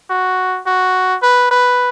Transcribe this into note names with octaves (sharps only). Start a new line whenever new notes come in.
F#4
F#4
B4
B4